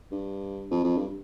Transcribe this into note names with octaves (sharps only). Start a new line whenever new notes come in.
G2
F2
F2
G2